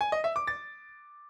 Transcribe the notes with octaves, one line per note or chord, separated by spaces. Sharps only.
G#5
D#5
E5
D6
A6